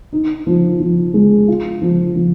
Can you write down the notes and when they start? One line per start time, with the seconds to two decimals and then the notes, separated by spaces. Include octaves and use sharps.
0.13 D#4
0.47 F3
0.80 F3
1.14 G#3
1.48 F4
1.82 F3
2.16 F3